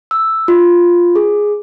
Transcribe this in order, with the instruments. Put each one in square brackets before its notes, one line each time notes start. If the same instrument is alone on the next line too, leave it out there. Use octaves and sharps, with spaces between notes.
[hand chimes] E6
F4
G#4